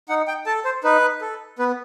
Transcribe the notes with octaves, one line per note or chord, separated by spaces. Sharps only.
D#4 F#5
G5
A4 A5
C5
D#4 B4
A4
B3 B4